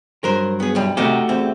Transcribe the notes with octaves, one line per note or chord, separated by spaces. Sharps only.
G2 F#3 A#4 C5
B3 G#4
B1 F#2 G3
F2 C3 D#3 A3 F#4 G4
E2 C4